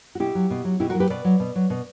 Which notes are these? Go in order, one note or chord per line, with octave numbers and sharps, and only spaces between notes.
F#4
B2 E4 G4
F#3
B2
F#3
B2 E4 G4
F#4 A#4
F#3
G4 B4
B2 B4 D5
F#3
B2
F#3
B2